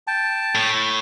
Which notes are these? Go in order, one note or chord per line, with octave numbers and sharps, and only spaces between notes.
G5 A5
A2